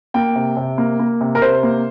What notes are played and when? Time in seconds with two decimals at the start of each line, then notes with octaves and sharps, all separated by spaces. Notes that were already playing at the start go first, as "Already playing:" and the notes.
0.14 A#3 G5
0.35 C3
0.57 C3
0.78 A#3
0.99 A#3
1.21 C3
1.35 A#4
1.42 C3 C5
1.63 A#3